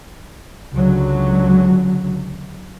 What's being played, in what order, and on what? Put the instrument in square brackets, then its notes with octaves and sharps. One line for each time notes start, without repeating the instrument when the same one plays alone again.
[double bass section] C#2 D3 F#3